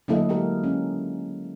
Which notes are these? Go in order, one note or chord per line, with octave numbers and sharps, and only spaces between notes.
D3 F#3 A#3 E4 A4 D#5
G#3 G4 A#4
C#4